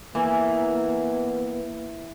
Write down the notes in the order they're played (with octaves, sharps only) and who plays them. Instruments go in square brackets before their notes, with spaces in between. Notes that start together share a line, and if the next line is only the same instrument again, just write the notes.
[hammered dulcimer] E3 [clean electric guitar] A#3 [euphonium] B3